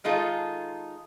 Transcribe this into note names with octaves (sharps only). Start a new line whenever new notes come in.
D#3 G#3 D#4 F4 A4